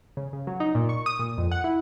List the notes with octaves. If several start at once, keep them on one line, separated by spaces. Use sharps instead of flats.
C#3
C#3
F#3
D#4
A#2
C#6
D#6
A#2
F2
F#5
E4